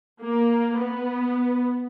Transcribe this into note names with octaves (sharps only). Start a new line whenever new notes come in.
A#3
B3